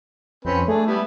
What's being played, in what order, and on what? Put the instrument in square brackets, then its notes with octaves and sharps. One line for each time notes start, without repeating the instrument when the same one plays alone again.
[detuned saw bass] F2 [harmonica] C4 C#4 B4
[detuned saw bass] A3 [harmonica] D4 G#4
[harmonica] G3 B3 E4